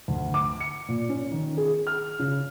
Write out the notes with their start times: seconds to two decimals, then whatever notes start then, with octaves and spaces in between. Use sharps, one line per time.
0.08 D2
0.34 D6
0.60 C#7
0.89 A#2
1.09 C#4
1.32 D#3
1.57 G#4
1.87 F6
2.19 C#3